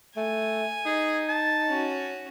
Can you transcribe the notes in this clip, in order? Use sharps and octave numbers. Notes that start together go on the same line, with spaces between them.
A3 G#5
D#4 G#4
A5
C#4 F#4